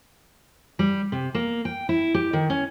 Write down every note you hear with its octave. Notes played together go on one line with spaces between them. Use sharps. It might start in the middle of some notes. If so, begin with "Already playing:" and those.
G3
C3
A#3
G5
E4
G4
D#3
C#4